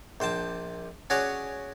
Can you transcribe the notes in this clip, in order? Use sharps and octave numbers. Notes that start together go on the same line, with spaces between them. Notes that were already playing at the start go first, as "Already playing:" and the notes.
A#1 C5 G5 A5
C#4 F#4 G#4 C#5 D5